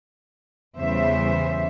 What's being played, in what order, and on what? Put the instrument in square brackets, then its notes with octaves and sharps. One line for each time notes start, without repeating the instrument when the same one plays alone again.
[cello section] E2 C#3 E3 G3 C5 E5